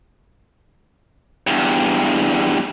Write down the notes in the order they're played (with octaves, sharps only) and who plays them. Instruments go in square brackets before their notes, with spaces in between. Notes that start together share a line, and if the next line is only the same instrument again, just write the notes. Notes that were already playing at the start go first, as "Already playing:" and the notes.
[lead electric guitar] E2 G2